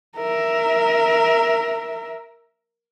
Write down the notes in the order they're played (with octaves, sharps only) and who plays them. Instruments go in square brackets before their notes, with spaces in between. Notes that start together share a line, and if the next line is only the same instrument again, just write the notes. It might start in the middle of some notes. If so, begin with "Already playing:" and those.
[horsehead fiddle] A#4 E5